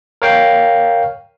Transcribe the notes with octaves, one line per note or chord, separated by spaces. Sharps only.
A#4 C#5 F5 G5